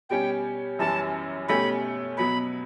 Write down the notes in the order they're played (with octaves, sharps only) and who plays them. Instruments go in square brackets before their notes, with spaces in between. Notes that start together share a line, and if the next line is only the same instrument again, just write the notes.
[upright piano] B2 G3 C#4 G4 [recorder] G5
[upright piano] F#2 E3 G3 C#4 [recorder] A5
[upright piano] B2 A3 C#4 G4 [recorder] B5
[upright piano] B2 F#3 B3 [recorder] B5